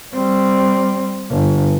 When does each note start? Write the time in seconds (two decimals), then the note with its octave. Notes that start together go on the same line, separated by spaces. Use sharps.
0.14 G3 C4
1.30 G1